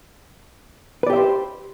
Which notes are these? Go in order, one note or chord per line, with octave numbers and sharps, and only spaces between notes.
G4 B4 C5 D5 E5